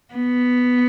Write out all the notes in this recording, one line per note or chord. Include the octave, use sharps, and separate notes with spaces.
B3